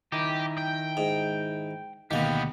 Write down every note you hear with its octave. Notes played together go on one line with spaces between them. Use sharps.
D#3 D#4 E4 G4
G5
G#2
D2 B2 D#3 A#3 B3 G4